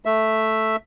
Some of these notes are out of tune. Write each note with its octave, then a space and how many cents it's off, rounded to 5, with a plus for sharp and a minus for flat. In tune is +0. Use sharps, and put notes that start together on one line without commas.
A3 +0 E5 +0